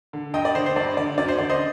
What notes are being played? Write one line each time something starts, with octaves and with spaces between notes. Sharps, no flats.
D3
G2 D#5 G5
D5
D3 C5
C5
G2 D5
D3 D5
F#2 D5
C5
D3 D5
C5 D#5